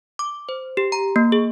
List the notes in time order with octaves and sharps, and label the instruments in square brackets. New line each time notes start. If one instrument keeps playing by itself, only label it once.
[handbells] D6
C5
G4
A#5
A#3
G#4